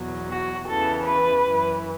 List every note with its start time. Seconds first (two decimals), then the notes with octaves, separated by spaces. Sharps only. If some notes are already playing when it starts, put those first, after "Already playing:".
Already playing: E2 B2 F#3
0.30 F#4
0.68 E2 C#3 E3 A4
1.07 B4
1.44 F#2 E3